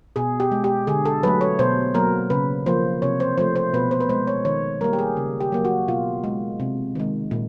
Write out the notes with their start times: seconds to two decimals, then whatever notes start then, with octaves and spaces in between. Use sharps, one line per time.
0.16 B2 G#4
0.40 G4
0.52 G#3
0.64 G4
0.87 D3 G#4
1.05 A4
1.23 F#3 A3 B4
1.41 C#5
1.59 B2 C5
1.94 F#3 A#3 A#4
2.30 C#3 B4
2.66 F3 A#3 C5
3.02 C3 C#5
3.20 C5
3.37 F3 A3 C5
3.56 C5
3.74 B2 B4
3.91 C5
4.00 B4
4.09 G#3 C5
4.27 C#5
4.45 D#3 C#5
4.81 G3 A#3 A#4
4.93 G4
4.99 G#4
5.17 C#3
5.41 G4
5.52 F#3 A#3
5.65 F#4
5.88 B2 F4
6.24 G#3
6.60 C3
6.95 D#3 G#3
7.31 A#2